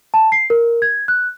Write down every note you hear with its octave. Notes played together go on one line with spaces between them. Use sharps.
A5
C7
A#4
G#6
F#6